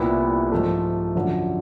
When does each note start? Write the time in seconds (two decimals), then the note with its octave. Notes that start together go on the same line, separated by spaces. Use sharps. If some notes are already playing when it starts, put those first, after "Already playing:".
Already playing: C2 A#2 G3 B3 E4
0.52 G#2 F3 A3
1.15 F#2 D3 F3